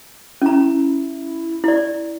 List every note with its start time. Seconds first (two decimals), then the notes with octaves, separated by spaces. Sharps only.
0.42 C#4 E4 A#5
1.64 E4 D5